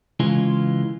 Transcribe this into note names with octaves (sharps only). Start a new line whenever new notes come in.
C#2 C#3 E3 G#3 F4 G#5